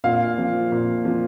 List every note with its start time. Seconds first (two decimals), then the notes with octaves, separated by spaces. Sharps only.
0.04 A#2 F5
0.38 F3
0.72 A#2
1.05 F3